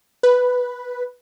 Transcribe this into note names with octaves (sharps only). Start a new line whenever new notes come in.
B4